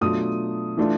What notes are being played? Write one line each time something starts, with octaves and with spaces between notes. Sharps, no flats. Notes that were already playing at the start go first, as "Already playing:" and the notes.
B2 F#3 A3 D4 F4 D#6
E3 A3 D4 F4